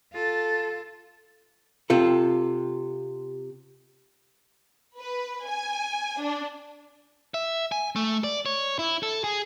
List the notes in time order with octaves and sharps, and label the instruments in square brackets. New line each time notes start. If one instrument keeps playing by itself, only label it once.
[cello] F4 A4
[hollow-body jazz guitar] C3 F4 A4
[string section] B4
G#5
D4
[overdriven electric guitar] E5
G#5
A3
D5
C#5
E4
A4
G#4